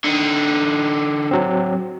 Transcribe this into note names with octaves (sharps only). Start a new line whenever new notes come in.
D3 D#4
F#3 C4